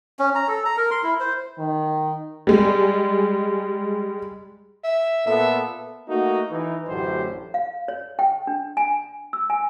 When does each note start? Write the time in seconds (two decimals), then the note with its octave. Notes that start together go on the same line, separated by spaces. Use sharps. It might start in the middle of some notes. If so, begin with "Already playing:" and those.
0.19 C#4
0.35 A#5
0.48 A4
0.65 A#5
0.77 A#4
0.91 C6
1.03 E4
1.20 C5
1.59 D#3
2.47 G3 G#3
4.84 E5
5.26 A#2 B3 A4 E5
6.08 A3 A#3 D#4 F#4
6.51 E3 D#4
6.88 A1 F#2 A2 D3 G4 C5
7.54 F5
7.88 C#5
8.19 G5
8.47 D4
8.77 G#5
9.33 E6
9.50 G#5